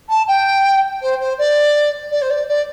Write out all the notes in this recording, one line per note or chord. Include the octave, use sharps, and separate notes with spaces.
A5
G5
C5
C5
D5
D5
C5
D5
D5